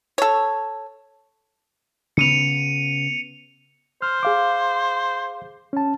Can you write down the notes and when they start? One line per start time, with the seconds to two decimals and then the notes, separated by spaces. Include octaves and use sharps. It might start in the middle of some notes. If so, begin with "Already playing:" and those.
0.18 A4 C#5
2.17 C#3 B3 C#7 D#7 F7
4.02 C5 F6
4.23 G#4 F5 D6
5.73 C#4 A5